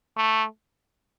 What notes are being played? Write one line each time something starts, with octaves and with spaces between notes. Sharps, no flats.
A3